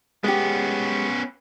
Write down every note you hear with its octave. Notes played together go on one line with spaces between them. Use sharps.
G#3 B3 C#4 G4